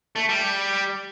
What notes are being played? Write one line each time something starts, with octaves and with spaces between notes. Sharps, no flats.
A3
G3